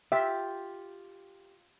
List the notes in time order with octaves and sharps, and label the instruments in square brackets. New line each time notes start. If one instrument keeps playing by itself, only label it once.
[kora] F4 G4 [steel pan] E5